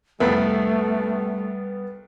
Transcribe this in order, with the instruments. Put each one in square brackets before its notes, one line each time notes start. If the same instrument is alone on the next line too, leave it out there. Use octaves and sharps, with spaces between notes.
[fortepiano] C2 F2 B5 [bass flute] G3 [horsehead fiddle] A3 [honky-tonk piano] B3